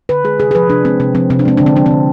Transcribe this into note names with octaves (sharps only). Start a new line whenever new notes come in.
D3 B4
G#3 G#4
C3 G#4
G#4
F3 B4
C3 D4
G#3 C4
C3 C4
F3 C4
C3 C4
D4
G#3 C4
D3 D4
C4
F3 D4
C4
D3